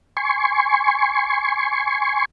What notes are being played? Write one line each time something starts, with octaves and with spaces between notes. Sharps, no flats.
G#5 C6 C#6